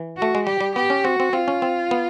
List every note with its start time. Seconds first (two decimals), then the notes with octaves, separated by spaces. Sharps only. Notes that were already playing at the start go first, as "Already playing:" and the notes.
Already playing: E3
0.17 F#4
0.22 A3
0.35 G#3
0.47 G3 G4
0.61 G3
0.75 B3 G4
0.90 C#4
1.05 C4 F#4
1.20 C4
1.33 C4 F4
1.48 C#4
1.62 C4
1.91 B3